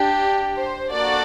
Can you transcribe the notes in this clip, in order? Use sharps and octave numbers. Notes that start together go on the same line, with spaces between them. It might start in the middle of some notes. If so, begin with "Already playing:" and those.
Already playing: D4 G4
C5
A#3 D4 F#4 A4 D5